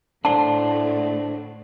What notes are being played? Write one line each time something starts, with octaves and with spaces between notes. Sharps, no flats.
A2 D3 A3 D4 C5 A5